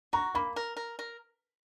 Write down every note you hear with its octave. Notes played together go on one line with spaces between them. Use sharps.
F#4 A#5
A#3 B5
A#4
A#4
A#4